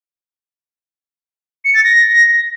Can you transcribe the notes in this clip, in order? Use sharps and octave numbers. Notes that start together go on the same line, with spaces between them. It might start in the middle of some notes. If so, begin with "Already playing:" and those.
C#7
A6
A#6